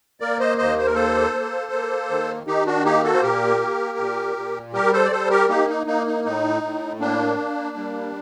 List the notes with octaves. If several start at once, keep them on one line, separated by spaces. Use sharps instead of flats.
A#3 A#4 D5
C5 D#5
D#2 C5 D#5
C5
A#4
A#3 A4 C5
A#3
A#3
D#3
D#3 D#4 G4
D4 F#4
A#3 D#4 G4
F#4 A4
C5
A#2 G4 A#4
A#3
A#2
A#2
G3 G4 A#4
A4 C5
D5
G3 A4 C5
G4 A#4
A#3 D#4 G4
D#4
A#3 D#4
D#4
A2 D#4
A2
A#3 D4
A#3
G3